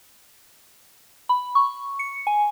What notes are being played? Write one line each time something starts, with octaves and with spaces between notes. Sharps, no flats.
B5
C#6
C#7
G#5